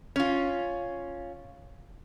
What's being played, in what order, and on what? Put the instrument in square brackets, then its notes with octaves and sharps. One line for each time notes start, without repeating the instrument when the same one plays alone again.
[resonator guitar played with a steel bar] C#4 F4